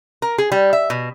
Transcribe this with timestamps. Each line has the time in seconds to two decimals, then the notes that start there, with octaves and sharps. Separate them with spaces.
0.22 A#4
0.38 G#4
0.52 G3
0.73 E5
0.90 B2